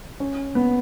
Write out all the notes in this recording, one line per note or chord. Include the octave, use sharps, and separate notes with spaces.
C#4
B3